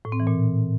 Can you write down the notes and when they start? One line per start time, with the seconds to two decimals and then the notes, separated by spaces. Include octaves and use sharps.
0.05 A2
0.12 C4
0.20 E3
0.27 A#2